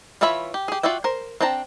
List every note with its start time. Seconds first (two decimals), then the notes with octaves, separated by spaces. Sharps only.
0.21 E3 F4 C#5 E5 B5
0.54 G4
0.68 G4 G#4
0.83 F4 F#4 D5 E5 G5
1.04 A#4 C5
1.41 C4 D4 G5 A5 A#5